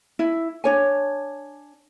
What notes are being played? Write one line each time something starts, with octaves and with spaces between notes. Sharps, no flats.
E4
D4 C#5 G#5